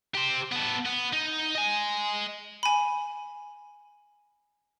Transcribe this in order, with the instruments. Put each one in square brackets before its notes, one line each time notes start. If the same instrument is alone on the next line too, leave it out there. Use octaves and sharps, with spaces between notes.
[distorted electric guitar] G4 C5
B3 A4
B3
D#4
D#5 G#5
[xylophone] G#5 B5